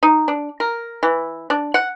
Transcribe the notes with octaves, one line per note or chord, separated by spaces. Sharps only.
D#4
D4
A#4
E3
D4
F#5